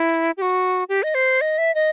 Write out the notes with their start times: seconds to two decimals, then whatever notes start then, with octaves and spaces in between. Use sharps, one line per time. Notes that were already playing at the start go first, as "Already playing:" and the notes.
Already playing: E4
0.37 G4
0.42 F#4
0.89 G4
1.03 D#5
1.15 C5
1.41 D#5
1.58 E5
1.75 D#5